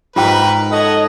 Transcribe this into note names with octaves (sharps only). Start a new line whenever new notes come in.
G#2 D#4 F4 G4 A#4 B4 G5
A4 C#5 D#5 F#5